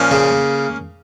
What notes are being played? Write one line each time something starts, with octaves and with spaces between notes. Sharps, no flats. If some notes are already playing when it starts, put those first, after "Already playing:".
Already playing: A#2 F3 A#3 C#4
C#3